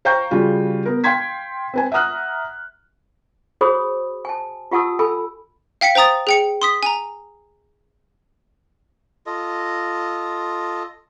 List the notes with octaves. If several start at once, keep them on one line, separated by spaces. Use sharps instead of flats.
C5 F5 G5 A#5 C#6 G6
C#3 G3 F4 F#4
B3 A#4
F5 G5 C6 G#6 B6
C4 B4 G#5
E5 F#5 A#5 D#6 F6 F#6
F#4 G#4 C5 C#5 B5 D#6
G#5 A5
F4 G4 F#5 A5 D#6 E6
A4 G#5 B5 E6
F5 G5 B6 C#7
C5 G5 A#5 D#6 A6
G#4 G5 C#7
C6 D#6 B6
G#5 A#5
F4 A4 D#5